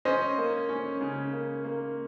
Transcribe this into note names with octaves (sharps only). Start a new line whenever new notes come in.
C#4 C5 D#5
A#3
C#4
C#3
A#3
A#3